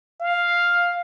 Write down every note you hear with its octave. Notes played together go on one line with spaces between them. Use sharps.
F5